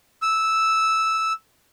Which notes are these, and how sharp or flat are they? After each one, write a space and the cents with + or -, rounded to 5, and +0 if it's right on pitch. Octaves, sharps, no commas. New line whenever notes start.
E6 -5